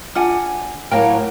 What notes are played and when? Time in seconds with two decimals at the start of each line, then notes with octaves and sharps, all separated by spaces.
0.15 D4 F4 F#5 G#5
0.91 A2 F#3 A#3 A#4 F5 G5 F6